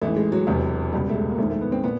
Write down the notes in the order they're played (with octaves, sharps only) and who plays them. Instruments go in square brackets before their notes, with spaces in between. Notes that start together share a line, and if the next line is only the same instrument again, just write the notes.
[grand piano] A1 G#2 E3 A3
G#3
F#3
E1 E2 C3 F#3
C#2 B2 G3
A3
G#3
A#3
A#1 G#2 D#3 A3
A3
B3
C4
A#2 B3